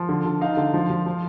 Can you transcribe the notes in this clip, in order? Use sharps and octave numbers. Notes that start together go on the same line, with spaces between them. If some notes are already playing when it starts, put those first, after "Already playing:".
Already playing: F3
D3
D3
D#4 F5
D3
F3
F3
F3